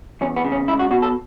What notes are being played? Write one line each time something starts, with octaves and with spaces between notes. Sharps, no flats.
E2 C#4
B3
C#3
C#4
C#2 E4
F#4
B2 F#4
A4